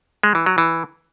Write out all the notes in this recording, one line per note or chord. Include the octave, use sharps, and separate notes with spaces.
G#3
E3
F#3
E3